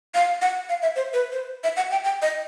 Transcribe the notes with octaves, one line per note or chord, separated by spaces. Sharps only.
F5
F#5
F5
E5
C5
B4
C5
E5
F#5
G5
G5
D#5